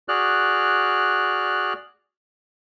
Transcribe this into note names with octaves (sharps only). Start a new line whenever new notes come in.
F#4 G#4 D5 F6 F#6